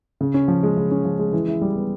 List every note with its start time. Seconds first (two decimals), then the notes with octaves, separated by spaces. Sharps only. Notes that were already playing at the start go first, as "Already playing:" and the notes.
0.21 C#3
0.34 C#4
0.48 F3
0.63 G#3
0.77 C#3
0.91 C#4
1.05 F3
1.19 G#3
1.33 E3
1.48 E4
1.61 G3
1.75 B3